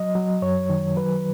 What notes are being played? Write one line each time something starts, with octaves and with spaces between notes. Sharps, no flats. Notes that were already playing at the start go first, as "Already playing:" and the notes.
Already playing: F#3 D#5
F#3
F#2 C#5
D#3
F#3 B4